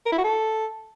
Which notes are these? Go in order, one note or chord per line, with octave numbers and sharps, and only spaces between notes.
A#4
E4
F#4
A4